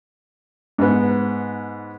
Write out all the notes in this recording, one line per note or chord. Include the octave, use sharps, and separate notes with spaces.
G#2 B3